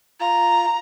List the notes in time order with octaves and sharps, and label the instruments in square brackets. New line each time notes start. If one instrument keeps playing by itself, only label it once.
[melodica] F4 [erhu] A#5